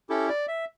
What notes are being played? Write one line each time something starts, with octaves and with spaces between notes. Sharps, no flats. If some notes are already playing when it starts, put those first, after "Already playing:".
C#4 E4 G4 A4
D5
E5